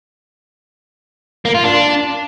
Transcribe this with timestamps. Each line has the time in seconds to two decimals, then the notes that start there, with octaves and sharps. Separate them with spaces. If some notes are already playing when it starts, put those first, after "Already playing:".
1.46 A#3
1.55 F4
1.64 D4